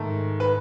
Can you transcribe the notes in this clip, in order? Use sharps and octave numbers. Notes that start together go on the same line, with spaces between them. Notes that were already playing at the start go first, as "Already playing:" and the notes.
Already playing: G#2 D#3 A3
B4